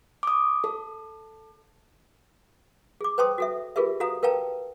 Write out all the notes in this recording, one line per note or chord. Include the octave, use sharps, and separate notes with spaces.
D6 D#6
A4
G#4 D6
B4 C5 G5 A5 C6 D#6
F#4 A4 E5
F4 G4 G#4 A#4 B4 E5
F#4 A4 F5 A#5 D#6
A#4 B4 F5 G5 A5 A#5